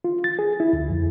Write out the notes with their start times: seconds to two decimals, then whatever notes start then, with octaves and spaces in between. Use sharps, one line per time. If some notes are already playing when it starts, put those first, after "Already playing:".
0.04 F4
0.24 A6
0.39 G#4
0.60 E4
0.73 D2
0.90 F2